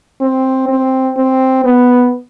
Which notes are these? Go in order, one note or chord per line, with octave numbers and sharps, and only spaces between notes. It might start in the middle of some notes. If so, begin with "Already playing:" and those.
C4
C4
C4
B3